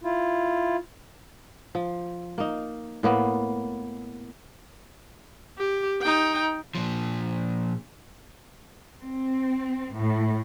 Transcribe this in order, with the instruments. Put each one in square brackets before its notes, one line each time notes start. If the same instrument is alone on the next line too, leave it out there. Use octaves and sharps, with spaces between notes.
[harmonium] E4 F4
[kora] F3
A#3 D#4
A2 A#3 B3
[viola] G4
D#4 G5
[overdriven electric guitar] A#2 F3
[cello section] C4
A2